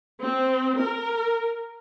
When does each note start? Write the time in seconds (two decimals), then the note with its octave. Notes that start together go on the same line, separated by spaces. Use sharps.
0.23 C4
0.79 A#4